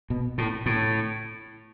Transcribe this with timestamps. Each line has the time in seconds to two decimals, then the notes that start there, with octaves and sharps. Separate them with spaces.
0.10 B2
0.38 A2
0.66 A2